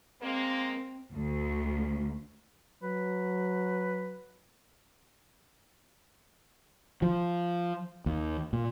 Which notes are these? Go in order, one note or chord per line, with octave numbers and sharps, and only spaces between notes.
G#3 A#3 C4
D2
F#3 B4
F3
D#2
A#2